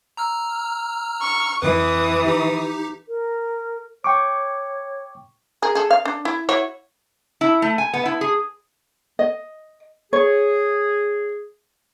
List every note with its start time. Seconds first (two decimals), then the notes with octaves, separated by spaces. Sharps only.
0.17 A#5 E6 F6
1.20 C#6
1.62 F2 E3 B4 D#6
2.26 D#4 G4
3.08 A#4
4.04 C#5 G5 C#6 D6
5.62 G#4 A#4
5.75 G#4 A4
5.91 F5
6.05 D4
6.25 E4
6.49 E4 F#4 C#5
7.41 E4
7.62 A3
7.78 G#5
7.94 B3
8.05 E4
8.21 G#4
9.19 D#5
10.13 G#4 C#5